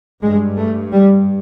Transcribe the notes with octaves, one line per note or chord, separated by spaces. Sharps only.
G2 G#3
A3
G3